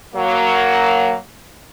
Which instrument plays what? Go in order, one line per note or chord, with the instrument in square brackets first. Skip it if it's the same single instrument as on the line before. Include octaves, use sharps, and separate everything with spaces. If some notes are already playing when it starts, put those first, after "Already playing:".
[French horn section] F#3 A#3